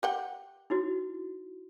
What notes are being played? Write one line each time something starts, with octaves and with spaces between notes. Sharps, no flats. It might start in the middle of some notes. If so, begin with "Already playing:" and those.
G4 F#5 G5
D#4 E4 F#4